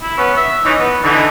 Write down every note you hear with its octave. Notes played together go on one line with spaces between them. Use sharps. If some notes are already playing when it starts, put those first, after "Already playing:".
E4
B3 C#4
E5
E3 C#4 D#4
B3
D3 E3 D#4